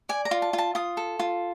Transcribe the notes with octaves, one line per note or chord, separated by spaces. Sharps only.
D5 G#5
A#5
F4
A5
F4
A5
F4 D#6
A4
F4